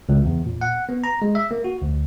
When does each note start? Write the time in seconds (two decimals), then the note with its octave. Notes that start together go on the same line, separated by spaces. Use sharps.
0.09 C#2
0.25 E2
0.46 A#2
0.61 F#5
0.89 B3
1.04 A#5
1.22 G#3
1.35 E5
1.51 A#3
1.64 F#4
1.82 D2